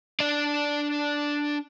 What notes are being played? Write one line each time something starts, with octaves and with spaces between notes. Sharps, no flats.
D4 D5